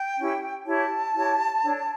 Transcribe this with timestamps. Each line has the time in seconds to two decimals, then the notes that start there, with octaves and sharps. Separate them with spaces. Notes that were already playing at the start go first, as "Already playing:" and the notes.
Already playing: G5
0.17 C#4 E4 G4
0.66 E4 G4 C#5 A5
1.15 E4 G4 C#5
1.63 D4 A4 C#5